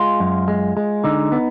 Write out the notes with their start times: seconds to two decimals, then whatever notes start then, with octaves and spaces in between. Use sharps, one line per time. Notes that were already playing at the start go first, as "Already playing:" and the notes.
Already playing: G#3 F4
0.20 F#2
0.48 G#3
0.77 G#3
1.04 D3 D#4
1.32 B3